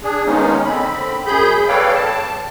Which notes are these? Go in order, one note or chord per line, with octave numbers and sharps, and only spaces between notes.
D4 G#4
D#3 G#3 A#3 B3 C#4 D#4
D3 C4 B5
F#2 G#4 B5 G6
A4 B4 C#5 D5 F5 G5
A5